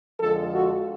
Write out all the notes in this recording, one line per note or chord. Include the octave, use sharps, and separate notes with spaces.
F2 D3 F3 G#3 A4
F#4